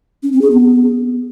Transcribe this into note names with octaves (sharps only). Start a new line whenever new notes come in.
C#4
C4
G#4
B3